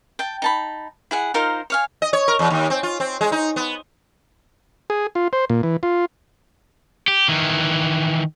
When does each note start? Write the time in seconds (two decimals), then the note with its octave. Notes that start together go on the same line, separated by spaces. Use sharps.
0.19 G5 A5
0.42 D#4 A5 B5
1.11 E4 G#4 F#5
1.34 D#4 F4 A#4 C5
1.70 C#5 F5 G#5
2.02 D#5
2.13 C#5
2.28 A#4
2.39 E2
2.50 D#2
2.70 C4
2.83 F4
3.00 C4
3.21 G#3
3.32 D#4
3.56 B3
4.90 G#4
5.15 F4
5.33 C5
5.49 A#2
5.63 E3
5.83 F4
7.08 G4
7.28 D#3 E3